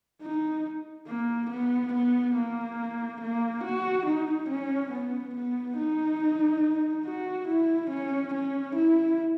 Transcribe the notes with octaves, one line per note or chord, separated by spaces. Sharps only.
D#4
A#3
B3
B3
A#3
A#3
F#4
D#4
C#4
B3
B3
D#4
F#4
E4
C#4
C#4
E4